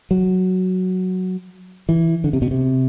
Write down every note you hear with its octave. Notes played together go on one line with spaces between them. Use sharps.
F#3
E3
D3
C3
B2
C3